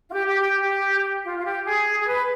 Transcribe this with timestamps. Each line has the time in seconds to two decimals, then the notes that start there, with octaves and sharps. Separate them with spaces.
0.09 F4
0.14 G4
0.27 G4
0.41 G4
0.62 G4
1.24 F4
1.37 F4
1.45 G4
1.66 G#4
2.01 G#4
2.07 B4